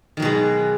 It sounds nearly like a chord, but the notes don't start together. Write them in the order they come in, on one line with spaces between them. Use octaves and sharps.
D#3 F#3 B2 G#3